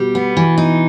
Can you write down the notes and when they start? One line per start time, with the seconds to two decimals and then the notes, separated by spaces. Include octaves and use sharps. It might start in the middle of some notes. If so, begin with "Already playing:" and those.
Already playing: B2 G3
0.15 B3
0.37 E3
0.58 D#4